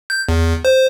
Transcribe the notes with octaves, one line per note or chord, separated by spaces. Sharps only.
G6
E2
C5